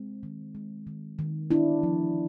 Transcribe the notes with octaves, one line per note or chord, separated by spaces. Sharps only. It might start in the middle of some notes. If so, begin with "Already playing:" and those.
Already playing: G#3 C4
D#3
G#3
D#3
D#3
B3 D4 E4
F3